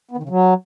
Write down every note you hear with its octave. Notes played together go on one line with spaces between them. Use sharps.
B3
D#3
C#3
F#3